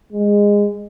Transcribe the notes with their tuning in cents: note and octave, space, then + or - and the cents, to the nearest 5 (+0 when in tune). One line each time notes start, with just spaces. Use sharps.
G#3 -20